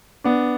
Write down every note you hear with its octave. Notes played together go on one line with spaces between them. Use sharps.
B3 D4